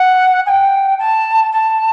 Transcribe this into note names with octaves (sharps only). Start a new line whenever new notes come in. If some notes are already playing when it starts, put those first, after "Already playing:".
Already playing: F#5
G#5
G5
A5
A5